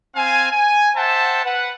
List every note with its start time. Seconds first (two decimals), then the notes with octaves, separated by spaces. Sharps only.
0.15 C4 F5 G#5
0.51 G#5
0.95 C5 E5 F#5 G5 A5
1.44 B4 F#5